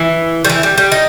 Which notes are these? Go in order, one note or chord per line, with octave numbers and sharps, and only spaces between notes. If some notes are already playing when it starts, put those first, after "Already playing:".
Already playing: E3
G3
E3
G3
G3
D#4